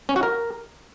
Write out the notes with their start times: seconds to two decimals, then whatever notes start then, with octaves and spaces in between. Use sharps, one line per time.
0.09 C#4
0.16 F#4
0.23 A#4